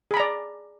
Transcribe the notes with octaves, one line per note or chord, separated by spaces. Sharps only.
G#4 D5 A#5 B5